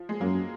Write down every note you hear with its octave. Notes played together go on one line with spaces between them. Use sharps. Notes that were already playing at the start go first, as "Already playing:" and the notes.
Already playing: F3
G#3
F#2 F#3 A#3